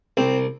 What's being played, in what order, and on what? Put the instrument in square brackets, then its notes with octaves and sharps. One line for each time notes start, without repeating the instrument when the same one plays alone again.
[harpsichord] C2 C4